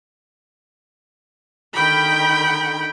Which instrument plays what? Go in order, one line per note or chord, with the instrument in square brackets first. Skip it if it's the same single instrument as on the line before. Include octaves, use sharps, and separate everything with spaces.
[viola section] D3 D#3 G5 B5